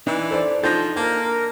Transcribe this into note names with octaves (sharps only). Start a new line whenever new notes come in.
E3 D4 D#4 E5
A4 C5 D5
F3 D4 D#4 A4 G6 A#6
A#3 A#4 A5